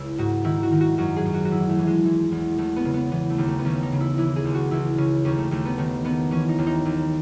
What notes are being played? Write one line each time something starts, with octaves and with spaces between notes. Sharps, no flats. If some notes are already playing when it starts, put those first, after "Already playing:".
Already playing: C#2 C#3 E4
G#2 F#4
D#3 E4
F#4
D#3
F#4
F#2 F#4
G#4
F#2
F#4
F#4
E3 E4
A3
E3
G#3
E3
E2
E2 A3
B3
C#3
B3
E3 B3
A3
D#2
A3
B3
D#2 C#4
D#4
C#3
E4
E3 E4
G#4
C#2
F#4
C#2 E4
C#3 C#4
D#2 C#4
A3
D#2 A3
B3
D#3 A3
D#3 B3
E3 C#4
D#4
D#2
D#4
D#2